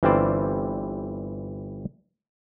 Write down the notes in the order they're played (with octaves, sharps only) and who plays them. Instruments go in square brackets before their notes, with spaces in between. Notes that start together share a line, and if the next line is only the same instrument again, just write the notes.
[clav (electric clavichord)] G1 E3 G3 C4 C5 D5